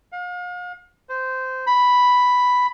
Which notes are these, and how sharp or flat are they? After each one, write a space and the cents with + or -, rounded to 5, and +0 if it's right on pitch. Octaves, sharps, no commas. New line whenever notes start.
F5 +40
C5 -15
B5 +0